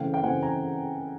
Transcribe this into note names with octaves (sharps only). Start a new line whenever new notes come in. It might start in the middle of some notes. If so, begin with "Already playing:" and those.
Already playing: C#3 E3 A3 C4 F5 G5
F5 G5
C#3 E3 A3 C4 F#5 G#5
G#5 A#5